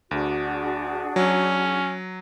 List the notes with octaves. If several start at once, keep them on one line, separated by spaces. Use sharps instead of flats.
D2 D4 F#4 G#4
F#3 C#4